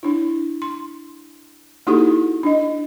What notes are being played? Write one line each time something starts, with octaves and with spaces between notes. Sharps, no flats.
D4 E4
C6
A#3 D#4 E4 F#4 G4 A4
D4 D#5